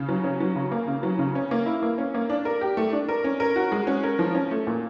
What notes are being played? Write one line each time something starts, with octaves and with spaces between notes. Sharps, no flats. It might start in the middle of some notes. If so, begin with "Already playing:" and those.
Already playing: C#3
F#3
C#4
F#3
C#3
A#3
C#3
F#3
C#3
C#4
A#3
E4
A#3
C#4
A#3
D4
A#4
G4
A3
D4
A#4
C#4
A#4
F#4
G#3
C#4
A#4
F3
C#4
A3
A#2